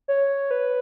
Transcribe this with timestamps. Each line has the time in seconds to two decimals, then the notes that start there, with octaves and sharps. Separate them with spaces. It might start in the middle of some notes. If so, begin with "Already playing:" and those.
0.08 C#5
0.51 B4